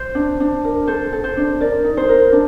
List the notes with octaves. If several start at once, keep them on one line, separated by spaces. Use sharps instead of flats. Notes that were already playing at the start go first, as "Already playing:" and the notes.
Already playing: C5
D4
D4
A#4
A4 C5
A4
C5
D4
A#4 D5
D#4
C5
A#4
D4